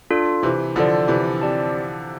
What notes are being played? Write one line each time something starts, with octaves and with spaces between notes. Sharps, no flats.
D4 F4 A4 D5
C3 E3
D3 F3 D4 F4 A4 D5
C3 E3
C4 G4 D5 A5